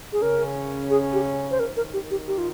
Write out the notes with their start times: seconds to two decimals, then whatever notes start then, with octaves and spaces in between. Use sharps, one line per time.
0.13 G#4
0.21 C#3 C#4 A#4
0.90 G#4
1.13 G4
1.51 C5
1.59 D#3 A#4
1.77 A#4
1.93 G4
2.11 G4
2.28 G4
2.38 F4